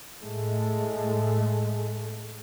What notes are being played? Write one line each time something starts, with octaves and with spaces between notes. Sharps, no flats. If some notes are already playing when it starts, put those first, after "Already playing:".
A2 G#3 A3